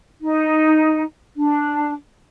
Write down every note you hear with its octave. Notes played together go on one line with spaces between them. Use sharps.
D#4
D4